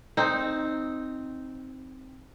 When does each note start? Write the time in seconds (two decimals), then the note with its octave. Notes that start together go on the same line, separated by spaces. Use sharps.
0.17 C4 D#4